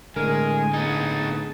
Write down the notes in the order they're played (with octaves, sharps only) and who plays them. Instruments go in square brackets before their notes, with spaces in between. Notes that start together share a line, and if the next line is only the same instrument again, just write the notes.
[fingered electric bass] A2 D3 [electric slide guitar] G#3 [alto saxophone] A#4 [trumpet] G#5
[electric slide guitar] B3 D#4 [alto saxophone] G#4 [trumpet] A5